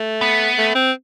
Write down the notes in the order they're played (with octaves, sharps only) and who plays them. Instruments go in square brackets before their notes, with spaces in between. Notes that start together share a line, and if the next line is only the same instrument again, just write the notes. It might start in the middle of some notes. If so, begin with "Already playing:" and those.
Already playing: [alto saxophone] A3
[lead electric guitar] B3
[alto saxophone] A3
C4